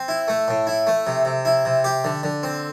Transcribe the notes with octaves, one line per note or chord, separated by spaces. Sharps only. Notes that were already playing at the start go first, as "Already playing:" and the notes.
Already playing: C4
E4
A3
A2
E4
A3
C3
C3
E4
C3
G4
D3
D3
C4